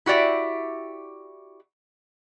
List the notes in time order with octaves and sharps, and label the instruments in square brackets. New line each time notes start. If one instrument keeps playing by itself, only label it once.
[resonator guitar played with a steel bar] E4 F#4 G4 D5 E5